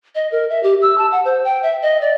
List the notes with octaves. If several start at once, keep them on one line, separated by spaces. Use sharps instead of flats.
D#5
A#4
E5
G4
E6
A5
F#5
C5
G5
E5
D#5
D5